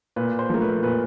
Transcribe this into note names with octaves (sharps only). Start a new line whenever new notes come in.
A#2 B4
C5
F3 A3 A#4
B4
A#2 B4